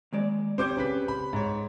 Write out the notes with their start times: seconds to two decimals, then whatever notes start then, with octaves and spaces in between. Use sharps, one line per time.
0.13 D#2 G#3 D5
0.58 C4 G4 C5 C#5 D6 G6
0.77 C#3 B4 B6
1.08 B5
1.33 G#2 C#5